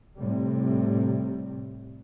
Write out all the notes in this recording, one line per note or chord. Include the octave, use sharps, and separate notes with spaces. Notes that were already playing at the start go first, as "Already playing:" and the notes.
A2 C3 G3